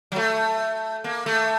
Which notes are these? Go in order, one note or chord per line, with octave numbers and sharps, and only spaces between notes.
F#3
A3
A#3
A3